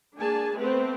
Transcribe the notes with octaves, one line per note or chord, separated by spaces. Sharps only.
A#3 D4 G#4 G#5 A5
A3 B3 C4 B4 C5